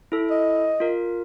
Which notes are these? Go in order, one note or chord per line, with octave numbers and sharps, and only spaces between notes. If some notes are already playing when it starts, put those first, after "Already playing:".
E4 A4
D#5
F4 A#4